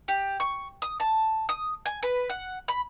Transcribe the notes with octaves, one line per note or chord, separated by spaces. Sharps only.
G4
C#6
D#6
A5
D#6
G#5
B4
F#5
B5